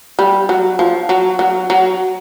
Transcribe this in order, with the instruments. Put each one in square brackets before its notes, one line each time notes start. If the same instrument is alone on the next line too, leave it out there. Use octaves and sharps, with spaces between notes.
[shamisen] G3
F#3
F3
F#3
F#3
F#3